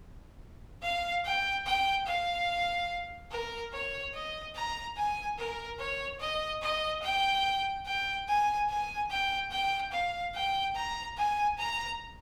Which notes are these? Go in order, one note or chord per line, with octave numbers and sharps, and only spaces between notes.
F5
G5
G5
F5
A#4
C#5
D#5
A#5
G#5
A#4
C#5
D#5
D#5
G5
G5
G#5
G#5
G5
G5
F5
G5
A#5
G#5
A#5